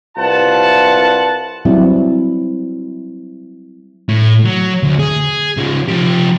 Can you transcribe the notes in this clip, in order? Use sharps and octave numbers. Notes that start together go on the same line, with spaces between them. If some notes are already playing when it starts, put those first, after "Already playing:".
C2 F4 B4 F#5 A5
F#3 G3 C4 E4
A2
F#3
D2
G#4
C#3 F3
F3 G4